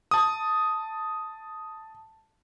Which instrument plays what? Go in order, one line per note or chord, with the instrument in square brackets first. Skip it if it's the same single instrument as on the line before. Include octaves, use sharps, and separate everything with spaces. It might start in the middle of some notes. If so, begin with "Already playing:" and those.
[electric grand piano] A5 D#6